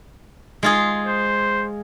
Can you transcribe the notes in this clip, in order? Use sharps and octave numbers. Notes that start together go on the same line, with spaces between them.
G#3 F4 G#4
C5